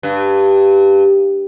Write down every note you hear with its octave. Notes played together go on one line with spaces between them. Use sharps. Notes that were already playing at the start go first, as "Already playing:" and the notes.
G2